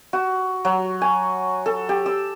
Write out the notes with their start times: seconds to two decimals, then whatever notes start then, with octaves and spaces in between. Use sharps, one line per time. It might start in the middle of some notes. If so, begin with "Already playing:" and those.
0.13 F#4
0.65 F#3
1.01 G#5
1.66 A4
1.89 G4
2.06 E6